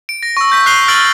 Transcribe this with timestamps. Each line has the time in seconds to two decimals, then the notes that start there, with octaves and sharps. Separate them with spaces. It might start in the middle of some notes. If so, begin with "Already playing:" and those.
0.09 D7
0.23 A#6
0.37 C#6 E6
0.50 C#6 G6 B6
0.66 F#6 C7 F7 G7
0.88 E6 F6 A6 D7 F#7